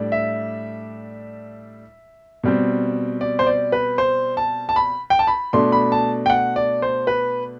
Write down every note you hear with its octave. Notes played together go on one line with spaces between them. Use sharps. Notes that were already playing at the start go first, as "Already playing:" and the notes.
Already playing: A2 G3 D4
E5
B2 G3 C4
D5
C5
D5
B4
C5
A5
A5
B5
G5
A5
B5
B2 A3 D4 C6
B5
A5
G5
F#5
D5
C5
B4